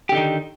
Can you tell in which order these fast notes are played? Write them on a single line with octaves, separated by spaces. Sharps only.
G4 D3 D#4 D#3